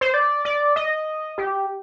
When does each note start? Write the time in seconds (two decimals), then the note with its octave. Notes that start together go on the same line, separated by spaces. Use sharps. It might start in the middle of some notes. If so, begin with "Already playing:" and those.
0.01 C5
0.14 D5
0.45 D5
0.76 D#5
1.38 G4